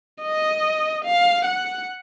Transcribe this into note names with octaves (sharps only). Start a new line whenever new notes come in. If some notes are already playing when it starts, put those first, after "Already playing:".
D#5
F5
F#5